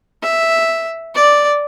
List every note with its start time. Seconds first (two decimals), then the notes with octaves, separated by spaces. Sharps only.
0.23 E5
1.15 D5